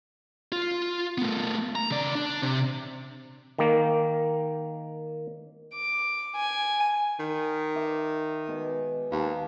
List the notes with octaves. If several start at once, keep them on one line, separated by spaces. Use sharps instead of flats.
F4
A3 B3
A#5
C#3 D5
D4
C3
D#3 A#3
D6
G#5
D#3
E5 C6 D6
B2 G#3
D#2 F5 A5